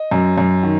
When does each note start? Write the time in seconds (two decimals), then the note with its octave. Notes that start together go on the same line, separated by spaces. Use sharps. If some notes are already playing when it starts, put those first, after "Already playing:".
Already playing: D#5
0.11 F#2
0.38 F#2
0.63 D#3